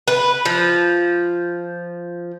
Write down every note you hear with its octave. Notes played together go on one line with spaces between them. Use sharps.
B4
F3